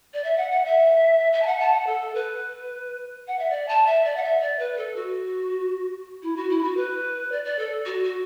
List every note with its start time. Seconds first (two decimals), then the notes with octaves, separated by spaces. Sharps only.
0.13 D5
0.24 E5
0.37 F#5
0.51 F#5
0.65 E5
1.33 E5
1.42 A5
1.46 F#5
1.60 A5
1.73 F#5
1.86 A4
2.14 B4
3.27 F#5
3.39 E5
3.50 D5
3.68 A5
3.86 E5
4.04 D5
4.16 F#5
4.23 E5
4.41 D5
4.59 B4
4.77 A4
4.96 F#4
6.22 E4
6.36 F#4
6.49 E4
6.63 F#4
6.77 B4
7.31 D5
7.45 D5
7.59 A4
7.85 F#4
8.03 F#4